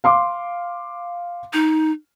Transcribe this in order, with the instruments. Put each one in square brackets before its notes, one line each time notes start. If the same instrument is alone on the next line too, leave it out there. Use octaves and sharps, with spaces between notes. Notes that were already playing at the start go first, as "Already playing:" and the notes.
[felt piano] F5 C6 D6
[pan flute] D#4